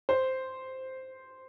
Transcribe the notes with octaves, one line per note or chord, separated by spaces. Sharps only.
C5